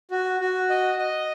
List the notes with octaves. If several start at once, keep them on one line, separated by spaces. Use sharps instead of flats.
F#4
F#4
D#5
D#5